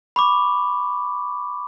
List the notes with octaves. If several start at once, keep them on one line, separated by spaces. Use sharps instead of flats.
B5 C#6 D6